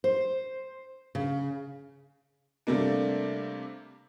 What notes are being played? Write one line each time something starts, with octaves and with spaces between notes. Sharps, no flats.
C5
C#3
C3 G3 A3 A#3 D4